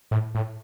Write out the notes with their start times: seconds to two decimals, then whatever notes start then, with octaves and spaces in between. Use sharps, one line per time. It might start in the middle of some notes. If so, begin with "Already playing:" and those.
0.11 A2
0.35 A2